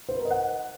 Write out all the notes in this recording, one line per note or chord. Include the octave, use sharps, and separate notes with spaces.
C5
B4
A#4
D#5
F#5